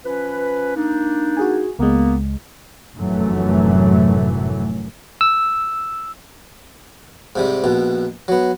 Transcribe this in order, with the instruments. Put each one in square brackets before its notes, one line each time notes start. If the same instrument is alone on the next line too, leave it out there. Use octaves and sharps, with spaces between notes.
[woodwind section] F3 C#4 B4
A#3 D4 D#4
[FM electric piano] F#4 G#4 G#5
[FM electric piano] C#2 G#3 [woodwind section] A#3 B3
[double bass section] F1 F#2 A2 E3 F#3 A3
[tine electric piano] E6
[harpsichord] G#2 C3 G3
A#1 B2
F#3 B3